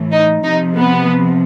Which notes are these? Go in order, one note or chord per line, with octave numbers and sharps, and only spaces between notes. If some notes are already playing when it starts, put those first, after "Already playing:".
Already playing: A2 E3
D#4
C3 F3 D#4
B3